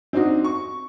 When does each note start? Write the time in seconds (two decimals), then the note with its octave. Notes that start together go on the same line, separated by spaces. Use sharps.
0.13 C4 D4 D#4 F#4
0.44 C#6